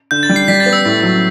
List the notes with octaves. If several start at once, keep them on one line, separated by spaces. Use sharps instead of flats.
D3 G6
A6
G3
C7
G3 B6
A6
B3
E6
A2
F#3